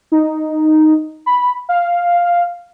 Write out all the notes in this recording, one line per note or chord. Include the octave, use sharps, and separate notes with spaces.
D#4
B5
F5